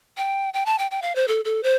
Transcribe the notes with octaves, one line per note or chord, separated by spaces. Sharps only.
G5
G5
A5
G5
G5
F5
C5
A4
A4
C5